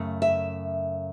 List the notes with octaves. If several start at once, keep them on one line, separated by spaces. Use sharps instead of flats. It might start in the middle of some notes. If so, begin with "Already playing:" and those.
Already playing: F#2 C#3 A3
E5